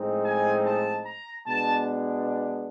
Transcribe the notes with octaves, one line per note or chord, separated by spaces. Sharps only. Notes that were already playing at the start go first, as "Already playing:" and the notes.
Already playing: A2 F3 G#3 C4 D#4
G#5
A5
A#5
B2 G#3 B3 D4 A5